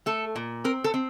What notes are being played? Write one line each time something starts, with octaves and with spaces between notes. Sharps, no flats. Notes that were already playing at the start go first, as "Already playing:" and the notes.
A3 A4
A#2
C4 A#4
A4
C4